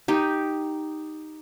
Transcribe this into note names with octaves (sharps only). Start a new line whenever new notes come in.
D#4 G4